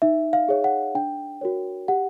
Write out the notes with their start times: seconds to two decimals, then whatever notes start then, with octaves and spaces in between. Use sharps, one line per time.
0.02 D#4 E5
0.33 F5
0.49 G#4 C#5
0.64 F#5
0.95 D4 G5
1.41 F#4 A#4 C#5
1.88 G4 F#5